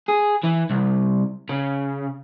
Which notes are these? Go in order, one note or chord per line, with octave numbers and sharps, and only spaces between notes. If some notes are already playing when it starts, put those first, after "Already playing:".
G#4
E3
C2
C#3